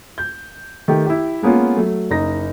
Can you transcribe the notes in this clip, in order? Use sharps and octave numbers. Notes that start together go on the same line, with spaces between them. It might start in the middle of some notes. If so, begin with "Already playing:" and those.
G6
D#3 A3 G4
E4 G4
G#3 A#3 B3 C#4 F4
F#3 A3
F#1 D#4 A#6